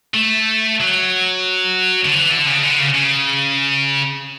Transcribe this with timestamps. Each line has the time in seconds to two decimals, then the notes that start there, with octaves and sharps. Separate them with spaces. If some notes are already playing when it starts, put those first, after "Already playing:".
0.14 A3
0.81 F#3
2.05 D3
2.13 E3
2.30 D3
2.46 C#3
2.63 D3
2.80 C#3
2.95 C#3